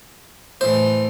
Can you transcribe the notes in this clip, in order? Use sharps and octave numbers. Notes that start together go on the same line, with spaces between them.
A2 E3 C5